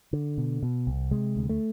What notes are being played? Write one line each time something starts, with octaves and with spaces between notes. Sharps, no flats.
D3
B2
B2
C2
C3 G#3
D2
A3